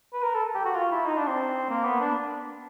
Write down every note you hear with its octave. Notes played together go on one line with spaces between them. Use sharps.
B4
A#4
A4
G4
F#4
F4
E4
D#4
D4
C4
A#3
B3
D4